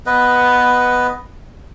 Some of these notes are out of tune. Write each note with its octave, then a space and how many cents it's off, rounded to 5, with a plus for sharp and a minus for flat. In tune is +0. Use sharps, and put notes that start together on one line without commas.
B3 +0 B4 +5 D#5 +0